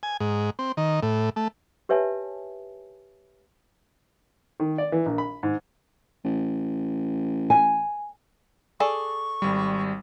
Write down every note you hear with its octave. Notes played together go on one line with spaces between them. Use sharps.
G#5
G#2
C4
D#3
A2
A3
G4 B4 C#5 E5 G#5 A5
D#3
D5
E3
A#1
B5
G#2
A1
G#5
G#4 A4 D5 C#6
G#1 G3